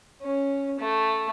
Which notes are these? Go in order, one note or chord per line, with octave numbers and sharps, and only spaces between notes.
C#4
A3